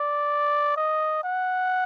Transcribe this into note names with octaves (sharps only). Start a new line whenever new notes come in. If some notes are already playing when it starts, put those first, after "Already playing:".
Already playing: D5
D#5
F#5